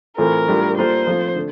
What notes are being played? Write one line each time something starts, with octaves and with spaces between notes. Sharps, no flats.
A2 E3 A3 C4 F4 A#4
A2 G3 D4 F4
G3 A#3 F4 A4 C5
F3 A3 C4 F4
D3 A3